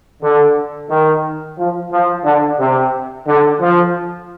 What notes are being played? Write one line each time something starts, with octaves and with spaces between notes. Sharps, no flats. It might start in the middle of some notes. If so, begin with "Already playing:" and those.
D3
D#3
F3
F3
D3
C3
D3
F3